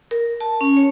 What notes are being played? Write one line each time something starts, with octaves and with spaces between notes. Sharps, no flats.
A#4
A5
C#4
C#5